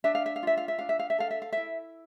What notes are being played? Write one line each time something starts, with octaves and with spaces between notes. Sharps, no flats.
D4 E5
F5
E5
F5
F4 E5
F5
E5
D4 F5
E5
F5
E5
A4 F5
E5
F5
E4 E5